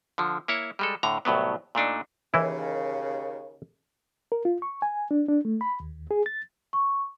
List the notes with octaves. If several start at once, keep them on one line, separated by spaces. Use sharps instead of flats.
D3 F3
A#3 E4 C#5
G3 G#3 A4
A2 D3 A#5
C2 A2 F#3 B3
A#2 A3 D4 D#4
D#2 C#3 E3 E4
A#4
F4
C#6
G#5
D4
D4
A3
B5
D#2
G#4
A6
C#6